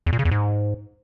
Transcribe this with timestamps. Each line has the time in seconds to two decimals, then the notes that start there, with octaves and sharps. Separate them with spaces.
0.06 E2
0.13 A#2
0.19 C#3
0.25 E2
0.31 G#2